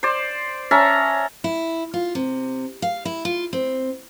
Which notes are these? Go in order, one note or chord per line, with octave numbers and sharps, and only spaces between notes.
C5 D5
C#4 E5 A5 A#5
E4
F4
C3
F5
E4
F4
C4